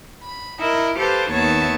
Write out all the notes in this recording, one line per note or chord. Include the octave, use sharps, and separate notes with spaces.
B5
E4 A#4 D#5 E5
G4 A4 B4 C5 F5 A5
D#2 D#3 B3 C#5 E5 A5